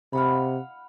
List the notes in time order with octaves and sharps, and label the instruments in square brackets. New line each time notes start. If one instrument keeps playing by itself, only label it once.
[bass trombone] C3 [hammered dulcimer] F5 F#5 B5